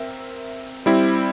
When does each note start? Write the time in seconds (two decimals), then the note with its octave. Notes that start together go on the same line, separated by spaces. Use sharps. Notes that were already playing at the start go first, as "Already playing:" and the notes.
Already playing: C4 A#4 E5
0.86 G3 C4 E4